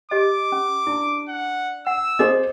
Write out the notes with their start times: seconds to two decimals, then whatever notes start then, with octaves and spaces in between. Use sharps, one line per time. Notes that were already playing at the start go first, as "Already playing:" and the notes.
0.11 G4 D#5 D6
0.52 C#4
0.87 D4 E4
1.29 F#5
1.87 F#5 E6
2.19 C4 G#4 C5 D#5 D6 D#6